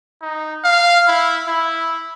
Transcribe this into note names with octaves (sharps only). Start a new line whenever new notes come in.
D#4
F5
E4
E4